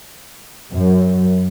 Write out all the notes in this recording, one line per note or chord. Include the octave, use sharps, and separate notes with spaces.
F#2